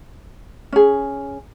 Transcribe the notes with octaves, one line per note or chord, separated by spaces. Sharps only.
C#4 G#4